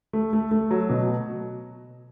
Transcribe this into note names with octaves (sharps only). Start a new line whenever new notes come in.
A3
A3
A3
F#3
B2